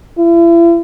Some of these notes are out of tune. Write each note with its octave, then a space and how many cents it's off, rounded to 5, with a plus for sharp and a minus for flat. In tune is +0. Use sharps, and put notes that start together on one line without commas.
E4 +40